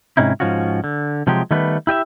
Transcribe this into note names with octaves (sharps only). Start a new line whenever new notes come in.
G#2 C3 C#4 D#4 E4
G#2 B2 F3 C#4 F4 F#4
D3
C3 F3 F#3 G#3 G4
D#3 G3 A3 B3 B4
E4 G4 D#5 E5